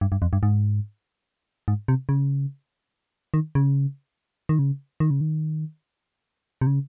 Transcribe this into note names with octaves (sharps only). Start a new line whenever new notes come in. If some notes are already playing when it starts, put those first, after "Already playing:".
G2
G2
F2
G2
G#2
G#2
C3
C#3
D#3
C#3
D#3
C#3
D#3
C#3
D#3
C3
C#3